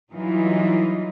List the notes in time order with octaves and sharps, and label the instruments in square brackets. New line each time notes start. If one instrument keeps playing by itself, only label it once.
[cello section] E3 F#3 G3 D#4 F4